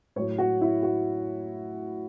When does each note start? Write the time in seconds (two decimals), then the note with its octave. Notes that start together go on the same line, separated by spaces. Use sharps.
0.16 A2 F#3 C#5
0.38 F#4
0.61 E4
0.83 F#4